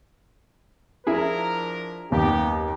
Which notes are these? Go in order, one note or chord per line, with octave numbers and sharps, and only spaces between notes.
F3 D4 E4 G#4 A#4
F#1 D#2 B3 G4